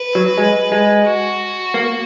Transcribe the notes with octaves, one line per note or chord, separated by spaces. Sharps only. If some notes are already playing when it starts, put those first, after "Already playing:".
Already playing: B4
F#3
G#3
G#3
F#4
A#3